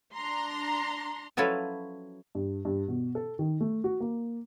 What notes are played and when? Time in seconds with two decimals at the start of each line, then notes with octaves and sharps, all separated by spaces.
0.14 D4 A#5 C6
1.37 F3 F#3 C#4 E4 A4 B4
2.35 G2
2.65 G2
2.88 B2
3.15 A4
3.39 D#3
3.60 A3
3.84 F#4
4.00 A#3